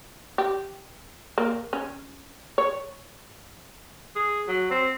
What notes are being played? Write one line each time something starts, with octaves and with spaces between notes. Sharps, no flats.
G4
A#3
C#4
C#5
G#4
F#3
C4